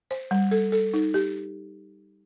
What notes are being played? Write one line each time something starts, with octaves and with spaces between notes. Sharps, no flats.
C5
G3
A4
A4
D#4
G4